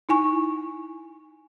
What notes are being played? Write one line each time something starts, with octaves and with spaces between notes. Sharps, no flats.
D#4 E4 G#5 C#6